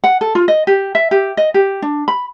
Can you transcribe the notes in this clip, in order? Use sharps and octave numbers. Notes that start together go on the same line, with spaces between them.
F#5
A4
F4
D#5
G4
E5
G4
D#5
G4
D4
B5